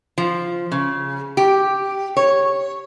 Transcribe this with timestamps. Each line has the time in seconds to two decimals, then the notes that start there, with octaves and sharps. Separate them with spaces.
0.18 F3
0.72 C#3
1.37 G4
2.17 C#5